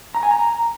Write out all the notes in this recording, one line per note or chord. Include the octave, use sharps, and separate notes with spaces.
A#5
G#5
A#5